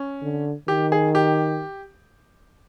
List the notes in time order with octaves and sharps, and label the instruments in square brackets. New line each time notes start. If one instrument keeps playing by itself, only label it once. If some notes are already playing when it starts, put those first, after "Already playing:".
Already playing: [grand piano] C#4
[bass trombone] D3
[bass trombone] D#3 [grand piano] G4
[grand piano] G#4
G4